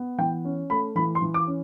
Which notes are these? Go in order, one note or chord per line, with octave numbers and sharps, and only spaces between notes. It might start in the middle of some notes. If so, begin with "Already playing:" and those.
Already playing: B3
E3 G5
C#4
A3 B5
E3 B5
C6
E3
D6
C#4